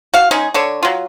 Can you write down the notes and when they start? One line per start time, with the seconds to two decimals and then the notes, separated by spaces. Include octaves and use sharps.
0.14 F#4 F5
0.31 G#3 C#4 D#4 G#4
0.54 D3 A4 C#5
0.83 F#3 F4